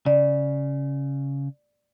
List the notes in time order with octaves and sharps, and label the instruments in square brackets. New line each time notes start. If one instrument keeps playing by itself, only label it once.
[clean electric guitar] C#3 [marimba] D5